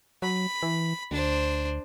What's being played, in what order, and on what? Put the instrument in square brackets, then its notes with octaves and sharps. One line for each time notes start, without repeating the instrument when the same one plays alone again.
[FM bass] F#3 [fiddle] B5
[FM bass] E3
[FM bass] D2 [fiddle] D4 C5